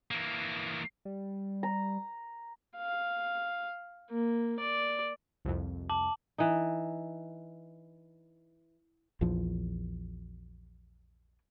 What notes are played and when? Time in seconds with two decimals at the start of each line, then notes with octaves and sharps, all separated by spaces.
0.11 E3 A#3
1.05 G3
1.63 A#5
2.77 F5
4.10 A#3
4.60 D5
5.45 C2 F2
5.90 A5 D6 F#7
6.38 E3 D#4
9.21 A#1 E2 E3 F3